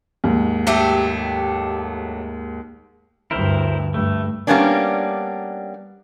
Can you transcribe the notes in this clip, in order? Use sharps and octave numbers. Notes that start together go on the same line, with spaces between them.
D#2 G#2
F#3 A3 G4
D2 G2 E4 A#4 C5
G2 A3
G3 A#3 B3 C#4 D4